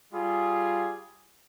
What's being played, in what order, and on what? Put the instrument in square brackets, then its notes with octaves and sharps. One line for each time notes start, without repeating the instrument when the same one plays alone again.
[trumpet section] G3 F4 G#4